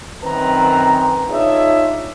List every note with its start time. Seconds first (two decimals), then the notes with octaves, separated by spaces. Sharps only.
0.24 F#2 D#3 C4 B4 A#5
1.29 D4 D#4 F4 G#4 C#5 E5